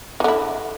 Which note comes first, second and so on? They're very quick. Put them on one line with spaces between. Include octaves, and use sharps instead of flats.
E3 D3 E4